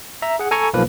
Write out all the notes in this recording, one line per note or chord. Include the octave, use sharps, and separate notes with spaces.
E5 A#5
G#4 F#5
A4 G#5 A#5 C#6
B1 F3 A#3 B4